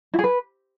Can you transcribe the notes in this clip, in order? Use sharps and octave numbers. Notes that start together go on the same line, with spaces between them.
E4
G#4
B4